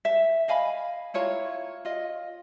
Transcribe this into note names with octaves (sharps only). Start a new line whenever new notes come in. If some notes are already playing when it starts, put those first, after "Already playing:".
E5
D#5 F5 G#5 B5
E4 F4 C#5 A#5
F4 D#5